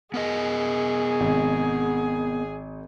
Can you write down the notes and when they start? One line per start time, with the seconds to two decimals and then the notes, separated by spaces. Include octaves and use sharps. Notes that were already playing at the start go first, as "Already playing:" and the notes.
0.14 B3 G#4 A#4 D#5
1.20 G#1